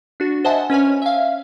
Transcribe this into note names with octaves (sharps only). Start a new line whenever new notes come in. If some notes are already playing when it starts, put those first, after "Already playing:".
D4 F#4
C5 D#5 E5 F#5 G#5 A5
C#4 B4 C#5 G#5
E5 F5